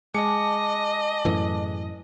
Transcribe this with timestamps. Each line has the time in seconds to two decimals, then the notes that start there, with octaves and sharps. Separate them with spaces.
0.14 G#3 D#5 G#5 A5 D6 C#7
1.25 F#2 A2 E3